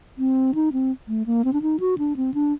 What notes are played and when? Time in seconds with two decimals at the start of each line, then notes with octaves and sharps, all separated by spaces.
0.18 C4
0.55 D#4
0.73 C4
1.08 A3
1.26 A#3
1.45 C4
1.53 D4
1.62 D#4
1.80 F#4
1.98 D4
2.16 C4
2.34 D4